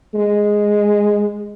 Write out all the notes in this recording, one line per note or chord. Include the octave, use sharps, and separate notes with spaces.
G#3